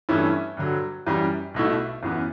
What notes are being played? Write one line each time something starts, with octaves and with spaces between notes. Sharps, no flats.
G2 E3 A3 C#4 E4
G2 D3 F#3
F#2 E3 G3
B1 B2 A3 E4
F#2 E3 B3